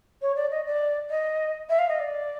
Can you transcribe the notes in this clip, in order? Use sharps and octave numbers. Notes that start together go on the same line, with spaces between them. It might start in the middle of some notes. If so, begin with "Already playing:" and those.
C#5
D5
D#5
D5
D#5
E5
F5
D#5
D5